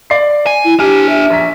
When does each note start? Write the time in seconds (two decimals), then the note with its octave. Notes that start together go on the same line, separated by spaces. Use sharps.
0.10 D5 C7
0.47 G#5
0.65 E4
0.80 D4 G4 G#5 F6
1.09 E5
1.30 A#1 A#5 B6